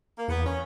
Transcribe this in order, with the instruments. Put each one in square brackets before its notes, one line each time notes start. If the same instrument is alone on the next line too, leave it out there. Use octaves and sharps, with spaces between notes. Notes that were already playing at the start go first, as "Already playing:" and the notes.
[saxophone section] A#3
[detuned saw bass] E2 [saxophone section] B3
[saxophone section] C#4